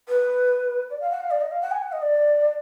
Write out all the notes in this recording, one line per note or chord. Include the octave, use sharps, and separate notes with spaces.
B4
D5
F5
F#5
F5
D5
D#5
F5
F#5
G#5
F#5
D#5
D5